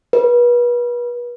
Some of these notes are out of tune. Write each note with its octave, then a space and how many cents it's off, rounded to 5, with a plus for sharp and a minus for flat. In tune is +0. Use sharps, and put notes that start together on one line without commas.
B4 -35